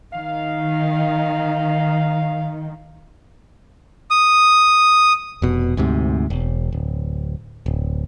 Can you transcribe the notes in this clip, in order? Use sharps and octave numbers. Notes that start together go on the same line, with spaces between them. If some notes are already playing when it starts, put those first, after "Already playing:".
D#3 F5
D#6
F1 B2
D2 G#2 C3
E1
D1
D1